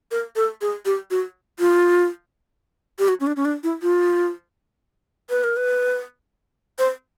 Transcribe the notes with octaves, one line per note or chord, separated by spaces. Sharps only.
A#4
A4
G#4
G4
F#4
F4
G4
F#4
C#4
D4
C#4
D4
E4
F4
B4
A#4
B4
C5